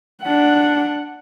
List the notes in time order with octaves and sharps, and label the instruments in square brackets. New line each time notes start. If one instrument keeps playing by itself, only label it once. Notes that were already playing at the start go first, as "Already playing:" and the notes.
[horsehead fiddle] D4 F#5